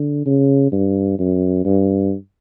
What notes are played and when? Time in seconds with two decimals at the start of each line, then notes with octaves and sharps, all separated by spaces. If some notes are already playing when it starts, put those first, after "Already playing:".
Already playing: D3
0.25 C#3
0.72 G2
1.19 F#2
1.65 G2